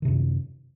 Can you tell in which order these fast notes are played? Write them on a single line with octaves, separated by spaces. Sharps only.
D#3 C3 F#2